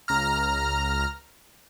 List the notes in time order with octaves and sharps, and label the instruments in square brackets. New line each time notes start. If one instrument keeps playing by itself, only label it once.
[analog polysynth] C#2 A#5 F6